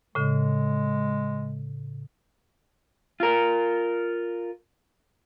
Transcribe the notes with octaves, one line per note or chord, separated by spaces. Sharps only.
A2 C#3 G#3
F4 A#4